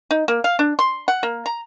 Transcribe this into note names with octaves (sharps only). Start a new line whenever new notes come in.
D#4
A#3
F5
D4
C6
F#5
A#3
A#5